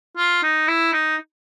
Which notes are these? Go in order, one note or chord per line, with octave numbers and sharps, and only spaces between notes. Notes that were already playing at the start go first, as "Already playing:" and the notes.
F4
D#4
E4
D#4